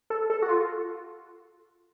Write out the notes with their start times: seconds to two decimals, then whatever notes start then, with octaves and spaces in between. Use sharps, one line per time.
0.10 A4
0.30 A4
0.42 F#4
0.49 F4